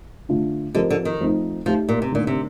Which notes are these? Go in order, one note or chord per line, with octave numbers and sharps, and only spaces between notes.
D3 A3 D4 F4
D3 F3 C4 G4 A#4 D#5
D3
D#3
F3 A3 C4 D#4
F3 A3 D#4 G4
A#2
C3
A#2 D3 A3 D#4 A#4 D5
C3